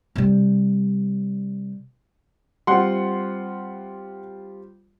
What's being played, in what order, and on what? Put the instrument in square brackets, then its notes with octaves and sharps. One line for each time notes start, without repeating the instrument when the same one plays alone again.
[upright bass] C3 G3
[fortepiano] G3 C4 F4 [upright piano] F#5 C6